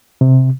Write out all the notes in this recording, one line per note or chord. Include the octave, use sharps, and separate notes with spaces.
C3